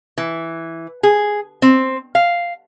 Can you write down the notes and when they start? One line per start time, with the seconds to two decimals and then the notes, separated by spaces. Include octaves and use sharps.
0.18 E3
1.03 G#4
1.62 C4
2.15 F5